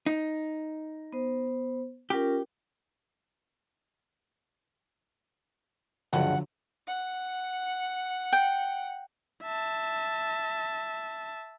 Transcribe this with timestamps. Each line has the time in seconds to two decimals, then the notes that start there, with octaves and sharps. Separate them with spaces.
0.06 D#4
1.12 B3 C5
2.10 C#4 F4 G4 A#4
6.13 C#2 G2 D3 F3 F#3 F#5
6.87 F#5
8.33 G5
9.43 E5 A5